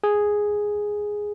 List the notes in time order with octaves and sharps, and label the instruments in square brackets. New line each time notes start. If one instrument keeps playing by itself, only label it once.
[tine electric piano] G#4